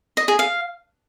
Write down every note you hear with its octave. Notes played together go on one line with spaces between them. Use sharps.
D#5
G#4
F5